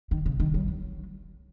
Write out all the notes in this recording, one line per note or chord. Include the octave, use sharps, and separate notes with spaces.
D#3
C#3
D#3
F#3
F#3